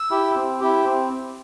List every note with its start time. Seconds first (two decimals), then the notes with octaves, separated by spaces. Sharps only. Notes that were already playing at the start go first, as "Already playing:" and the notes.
Already playing: E6
0.11 E4 G4
0.36 C4
0.61 E4 G4
0.84 C4